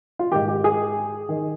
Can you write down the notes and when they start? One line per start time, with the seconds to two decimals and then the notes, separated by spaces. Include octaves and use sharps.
0.19 F4
0.32 G#2 D#3 G4
0.48 G4
0.64 G#4
1.29 D#3